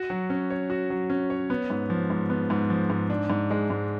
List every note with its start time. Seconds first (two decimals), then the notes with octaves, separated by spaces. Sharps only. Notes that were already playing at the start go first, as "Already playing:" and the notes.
Already playing: F#4
0.10 F#3
0.30 C#4
0.50 C#5
0.70 F#4
0.90 F#3
1.10 C#4
1.30 C#5
1.50 B3
1.70 G#2
1.90 F3
2.10 G#2
2.30 B3
2.50 G#2
2.70 F3
2.90 G#2
3.10 D4
3.30 G#2
3.51 G#3
3.70 G#2